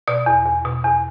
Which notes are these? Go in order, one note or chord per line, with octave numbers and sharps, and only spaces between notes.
B2 D5
E2
E2
B2
E2